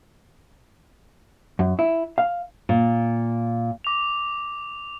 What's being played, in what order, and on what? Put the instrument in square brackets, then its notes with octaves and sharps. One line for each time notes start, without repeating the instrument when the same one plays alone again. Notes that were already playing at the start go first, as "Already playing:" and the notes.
[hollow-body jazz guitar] F#2
E4
F5
[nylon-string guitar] A#2
[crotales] D6 F7